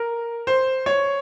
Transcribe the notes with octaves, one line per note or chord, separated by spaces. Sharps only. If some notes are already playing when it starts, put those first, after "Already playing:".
Already playing: A#4
C5
C#5